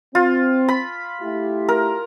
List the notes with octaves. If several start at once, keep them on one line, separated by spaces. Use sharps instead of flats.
C4 F4
B5
A3 E4 G4
A#4